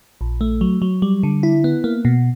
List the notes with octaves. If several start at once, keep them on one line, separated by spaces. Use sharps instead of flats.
A#1
A3
F#3
F#3
G3
D3
E4
B3
A#3
B2